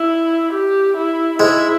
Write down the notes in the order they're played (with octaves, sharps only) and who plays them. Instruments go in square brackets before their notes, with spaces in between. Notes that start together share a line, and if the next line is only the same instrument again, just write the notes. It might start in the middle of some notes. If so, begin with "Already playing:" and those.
Already playing: [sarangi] E4
G4
E4
[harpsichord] G#2 G#3 [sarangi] E4